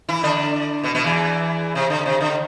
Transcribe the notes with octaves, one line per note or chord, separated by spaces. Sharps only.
E3 E4
D3 D4
B2 B3
B2 B3
E2 E3
C3
D3
C3
D3